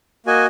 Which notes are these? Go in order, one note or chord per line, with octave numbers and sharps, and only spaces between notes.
A#3 F#4 D#5 G#5